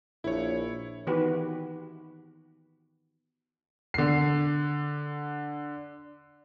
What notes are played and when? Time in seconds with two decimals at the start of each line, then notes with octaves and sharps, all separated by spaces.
0.24 A#1 E4 C#5
1.07 D#3 E3 B3 F#4 G4 B4
3.94 D3 C7